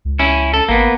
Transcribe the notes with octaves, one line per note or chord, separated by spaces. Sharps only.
C#2
C#4 E4
A4
G#1 A#3 B3